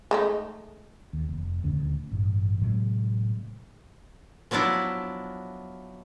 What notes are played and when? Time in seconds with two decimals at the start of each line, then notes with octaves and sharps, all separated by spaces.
0.11 G#3 A3 D#4
1.13 D#2
1.29 F1
1.64 D#1 D2 D3 C#4
2.11 A1 G2
2.62 A2 C3 F#3 G#3
4.51 F3 F#3 B3 D4 E4